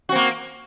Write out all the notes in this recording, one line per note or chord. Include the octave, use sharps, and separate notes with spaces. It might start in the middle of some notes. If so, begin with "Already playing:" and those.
A#3 C4 F#4